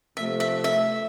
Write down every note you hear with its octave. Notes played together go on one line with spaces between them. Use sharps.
C3 F3 A3 E5
E5
E5